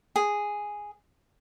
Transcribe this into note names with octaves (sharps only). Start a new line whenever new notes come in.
G#4